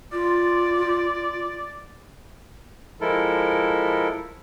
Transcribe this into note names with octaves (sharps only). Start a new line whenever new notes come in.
F4 D5
F3 G#3 E4 A4 A#4